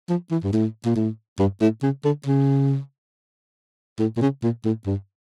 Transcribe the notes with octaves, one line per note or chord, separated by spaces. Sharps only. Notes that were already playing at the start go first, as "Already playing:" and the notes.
F3
E3
G2
A2
A#2
A2
G2
A2
C#3
D3
C#3
A2
A#2
C#3
A#2
A2
G2